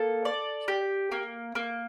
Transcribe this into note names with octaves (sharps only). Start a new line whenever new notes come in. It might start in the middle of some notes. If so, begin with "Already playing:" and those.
Already playing: A#3 A4
D5
G4
A#3
A#3